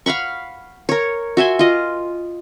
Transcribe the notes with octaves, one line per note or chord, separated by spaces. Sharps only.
F5 F#5 B5 C#6
A#4 C#5
F#4 E5 G#5 C6
F4 D#5